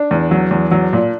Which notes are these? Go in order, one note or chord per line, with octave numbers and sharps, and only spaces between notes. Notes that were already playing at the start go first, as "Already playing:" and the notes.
Already playing: D4
E2
F#3
E2
F#3
A#2